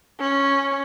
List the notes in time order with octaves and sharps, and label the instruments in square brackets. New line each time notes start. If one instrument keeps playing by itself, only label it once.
[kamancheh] C#4